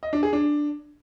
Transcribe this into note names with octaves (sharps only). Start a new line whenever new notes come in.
D#5
D4
G#4
D4